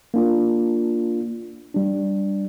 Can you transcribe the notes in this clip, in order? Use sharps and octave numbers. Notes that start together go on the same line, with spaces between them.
A#3 D4 F4
G3 D4